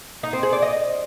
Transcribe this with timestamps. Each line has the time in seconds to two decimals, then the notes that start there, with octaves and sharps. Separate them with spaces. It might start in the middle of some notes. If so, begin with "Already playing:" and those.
0.23 D#4
0.33 C4
0.43 G#4
0.53 D5
0.62 D#5